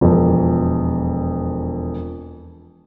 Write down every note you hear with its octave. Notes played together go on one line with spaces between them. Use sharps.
E1 F2